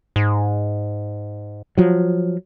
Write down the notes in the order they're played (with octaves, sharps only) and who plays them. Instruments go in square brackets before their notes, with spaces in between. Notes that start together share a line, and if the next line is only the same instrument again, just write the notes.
[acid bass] G#2
[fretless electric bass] F3 F#3